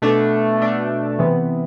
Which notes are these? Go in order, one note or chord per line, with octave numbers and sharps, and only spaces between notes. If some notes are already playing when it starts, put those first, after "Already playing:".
B2 A3 D4
B2 A3 D4
C3 E3 B3